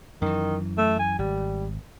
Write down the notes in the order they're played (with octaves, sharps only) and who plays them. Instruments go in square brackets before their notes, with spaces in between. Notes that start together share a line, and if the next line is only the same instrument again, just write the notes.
[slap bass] F#2 E3 [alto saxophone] D#3
[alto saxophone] A3
G#5
[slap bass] G#1 [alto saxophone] G3